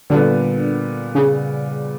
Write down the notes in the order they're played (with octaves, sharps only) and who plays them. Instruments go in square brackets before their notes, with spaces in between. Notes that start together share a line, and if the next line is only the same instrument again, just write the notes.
[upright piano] A#2 G3 B3 [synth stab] D3
[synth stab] C#3